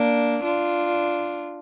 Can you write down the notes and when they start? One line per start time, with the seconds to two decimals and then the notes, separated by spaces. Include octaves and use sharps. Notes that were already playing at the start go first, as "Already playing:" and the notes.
Already playing: A#3 D4
0.43 D4 F4